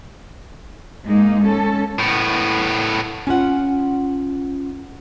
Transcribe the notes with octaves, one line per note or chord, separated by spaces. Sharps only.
G#2 G#3 A#3 D#4
C#4 A4
A2 B3
C#4 F4 F#5